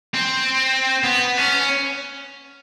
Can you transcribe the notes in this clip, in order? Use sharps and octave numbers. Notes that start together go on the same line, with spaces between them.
C4
B3
C#4